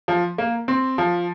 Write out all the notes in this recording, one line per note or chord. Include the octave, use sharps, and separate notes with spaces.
F3
A#3
C4
F3